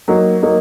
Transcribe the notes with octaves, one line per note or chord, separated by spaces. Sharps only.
F#3 A#3 D#4
F#3 A#3 D#4